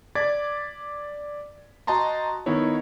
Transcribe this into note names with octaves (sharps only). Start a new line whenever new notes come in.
D5 D6 G#6 A6 B6
F#4 D#5 G5 A5 A#5 C6
D#3 B3 D#4 E4 C#5